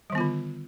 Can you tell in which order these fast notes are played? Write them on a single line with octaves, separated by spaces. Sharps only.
G3 D#3 B3 F4 D3